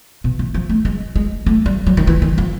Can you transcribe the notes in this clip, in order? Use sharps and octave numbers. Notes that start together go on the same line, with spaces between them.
B2
E3
F3
A3
G#3
G#3
A3
G3
F#3
D#3
E3
D#3
F3